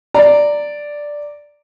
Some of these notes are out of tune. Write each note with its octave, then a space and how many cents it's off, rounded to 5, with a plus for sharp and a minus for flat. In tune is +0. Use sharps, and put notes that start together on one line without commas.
D5 +0 A#5 -15